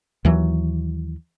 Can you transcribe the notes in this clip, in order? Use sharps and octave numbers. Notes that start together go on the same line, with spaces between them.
D#2 E3 F#3